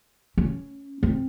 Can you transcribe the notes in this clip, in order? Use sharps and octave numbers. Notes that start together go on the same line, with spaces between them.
C#4
C4